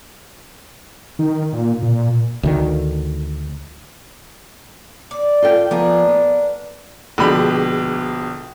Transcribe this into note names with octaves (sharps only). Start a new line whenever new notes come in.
D#3
A#2
A#2
D2 D#3
D5
F4 A4 G5
F3 B3 D4 A#4 G#5
B3
A#1 B2 D3 G#3 G4 B5